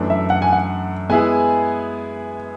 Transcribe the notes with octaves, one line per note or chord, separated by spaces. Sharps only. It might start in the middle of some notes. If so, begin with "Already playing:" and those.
Already playing: F#2 E3 A3 D4
E5
F#5
G#5
F#5
G#3 B3 E4 G#4 G#5